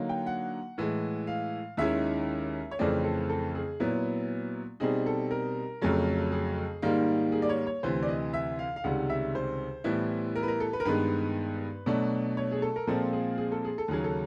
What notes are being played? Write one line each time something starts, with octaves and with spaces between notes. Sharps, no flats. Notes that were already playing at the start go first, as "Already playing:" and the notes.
Already playing: D3 F#3 A#3 D#4
G5
F#5
A2 E3 G#3
F5
D#2 D#3 G#3 C#4 E4 E5
C#5
F2 C#3 E3 A3 C4 D5
A4
A4
G#4
A#2 F#3 B3 E4
B2 G3 C4 D#4 G#4
A4
A#4
F2 C#3 F#3 A3
G#4
G#2 D#3 G3 A#3
G#4
D5
C#5
C#5
D2 C3 E3 C5
D5
D#5
E5
F5
F5
C#2 C3 D#3 G3 F#5
E5
C5
A2 E3 G3 B3 E4
A#4
B4
A#4
A4
B4
A#4
G2 D#3 G#3 B3 B4
B2 F#3 A3 D4
C#5
G#4
A4
A#4
A#2 F3 G#3 C4 F4 A4
G#4
G#4
A4
G#4
A4
D#2 C#3 F#3 G#4
A4